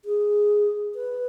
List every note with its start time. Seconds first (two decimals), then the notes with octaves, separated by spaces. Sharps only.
0.05 G#4
0.95 B4